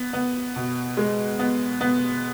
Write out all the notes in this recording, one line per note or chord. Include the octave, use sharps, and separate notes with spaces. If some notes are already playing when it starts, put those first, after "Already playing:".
Already playing: B3
B3
B2
G#3
B3
B3